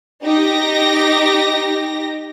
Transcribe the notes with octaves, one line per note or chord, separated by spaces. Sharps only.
D#4 G4 A#6